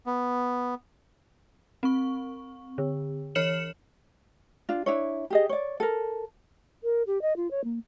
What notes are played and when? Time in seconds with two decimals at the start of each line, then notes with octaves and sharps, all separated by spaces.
0.06 B3
1.83 C4 C#6
2.78 D3
3.35 E3 C#5 F6 C#7 E7 F#7
4.69 D4 F4
4.86 D4 E4 C#5
5.30 G4 G#4 D#5
5.49 C#5 D5
5.80 A4 A#4
6.83 A#4
7.07 G4
7.22 D#5
7.36 F4
7.51 C#5
7.64 A#3